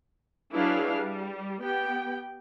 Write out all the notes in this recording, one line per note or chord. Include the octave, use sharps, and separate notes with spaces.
F#3 D4 E4 G#4 B4 F5
G3
B3 G4 G5